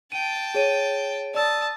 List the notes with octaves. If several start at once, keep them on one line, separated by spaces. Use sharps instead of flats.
G5 A5 D#7
G#4 C#5 D#7
D5 A5 D#6 E6